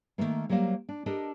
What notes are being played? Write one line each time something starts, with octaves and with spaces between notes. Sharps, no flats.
D#3 F3 A3 A#3
F#3 G3 A#3 C5 F5
D4
D4 G4 A4 A#4 D#5